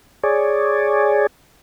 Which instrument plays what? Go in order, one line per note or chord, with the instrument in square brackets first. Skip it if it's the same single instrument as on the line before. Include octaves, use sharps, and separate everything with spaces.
[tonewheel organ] G#4 C#5 D5